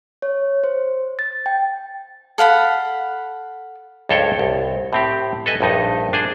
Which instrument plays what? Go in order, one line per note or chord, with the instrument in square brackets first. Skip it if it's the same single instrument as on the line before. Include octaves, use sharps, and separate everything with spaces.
[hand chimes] C#5
C5
A6
G5
[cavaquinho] A4 F5 F#5 B5
[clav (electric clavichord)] C#2 G2 A4 C5 C#5 G5
C2
A2 C4 G4
A4 B4 D#5 G#5
A#1 G2 D#4
D4 G#4 C5